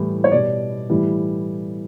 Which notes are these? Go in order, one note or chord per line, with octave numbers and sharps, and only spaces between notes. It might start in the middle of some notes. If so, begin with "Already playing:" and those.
Already playing: A2 E3 G3
C#5
B2 G3 D5
A2 E3 G3